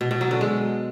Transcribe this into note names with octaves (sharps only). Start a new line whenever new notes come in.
B2
B2
F#3
D3
G#3